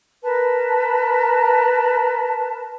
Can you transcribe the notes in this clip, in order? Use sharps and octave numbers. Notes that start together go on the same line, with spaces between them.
A#4 B4 A5